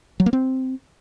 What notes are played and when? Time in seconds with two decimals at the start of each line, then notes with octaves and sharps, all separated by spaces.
0.20 F#3
0.26 A#3
0.33 C4